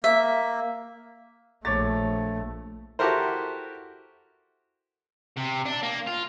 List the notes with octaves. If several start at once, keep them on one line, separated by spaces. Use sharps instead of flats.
A#3 E5
A#1 A3 C#5 D6 A6
E4 F#4 G4 A4 A#4 C5
C3
D4
A#3
F4